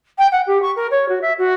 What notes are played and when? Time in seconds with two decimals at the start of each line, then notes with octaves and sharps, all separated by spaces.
0.18 G5
0.31 F#5
0.46 G4
0.62 C#6
0.76 A#4
0.91 C#5
1.08 F#4
1.21 E5
1.38 F#4